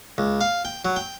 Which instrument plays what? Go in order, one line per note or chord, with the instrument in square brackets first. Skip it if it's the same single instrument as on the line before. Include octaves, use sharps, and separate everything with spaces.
[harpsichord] C#2
F5
G5
F#3
G5